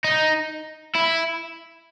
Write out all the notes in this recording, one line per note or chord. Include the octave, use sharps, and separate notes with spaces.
D#4
E4